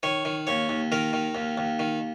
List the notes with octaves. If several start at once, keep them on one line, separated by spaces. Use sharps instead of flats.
D#3 C#5
D#3
D#2 C#5
D#2
D#3 A#4
D#3
D#2
D#2
D#3